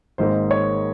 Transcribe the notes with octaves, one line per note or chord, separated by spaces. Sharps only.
G#1 G#2 D#3 A#3 C5
C#5